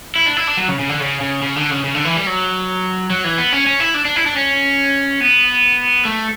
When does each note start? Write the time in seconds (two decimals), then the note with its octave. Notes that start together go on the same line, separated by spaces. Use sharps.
0.16 E4
0.26 D4
0.37 E4
0.47 D4
0.57 F#3
0.68 C#3
0.79 C#3
0.89 D3
1.00 C#3
1.21 C#3
1.42 C#3
1.56 D3
1.71 C#3
1.84 C#3
1.95 D3
2.05 E3
2.15 G3
2.27 F#3
3.10 F#3
3.24 E3
3.38 B3
3.52 C#4
3.66 C#4
3.80 E4
3.94 D4
4.05 D4
4.16 E4
4.26 D4
4.36 C#4
5.21 B3
6.05 A3